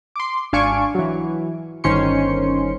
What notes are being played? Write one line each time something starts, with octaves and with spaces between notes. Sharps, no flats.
C6 D6
G#1 D4 F5 G#5 C#6 D7
E3 F#3
G1 D#3 C#4 C5 C6 C#7